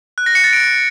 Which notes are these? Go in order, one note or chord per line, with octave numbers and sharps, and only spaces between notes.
F#6
A#6
C#7
A6
D7